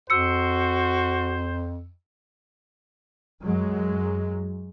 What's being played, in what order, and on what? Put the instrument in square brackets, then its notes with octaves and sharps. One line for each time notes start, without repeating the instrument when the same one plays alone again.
[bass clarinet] F2 [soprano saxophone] F#4 [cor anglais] C5 [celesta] E6 C#7
[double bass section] F#2 F#3 G#3